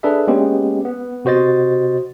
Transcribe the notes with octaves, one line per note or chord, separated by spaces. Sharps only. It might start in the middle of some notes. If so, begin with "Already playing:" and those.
D4 G#4 A4 B4 D5 E5
G#3 A#3 B3 C#4 G4
B3
C3 F#4 C5 D#5 A6